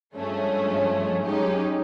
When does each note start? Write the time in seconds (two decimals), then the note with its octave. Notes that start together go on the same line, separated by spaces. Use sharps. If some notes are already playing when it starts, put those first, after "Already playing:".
0.15 G2 F3 G#3 A3 C#4
1.24 F#3 G#3 C#4 D#4 G4